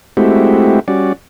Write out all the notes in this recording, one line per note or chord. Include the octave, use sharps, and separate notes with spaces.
G#3 A3 C4 E4 F#4 G4
G3 C#4 F#4 D5